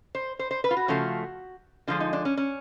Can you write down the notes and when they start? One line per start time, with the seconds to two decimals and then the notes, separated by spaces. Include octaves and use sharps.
0.15 C5
0.39 C5
0.51 C5
0.64 B4
0.71 F4
0.77 F#4
0.88 C#3 F3 A3
1.87 D3 F3 G#3 F4
2.00 D#4
2.13 D4
2.25 C#4
2.37 C#4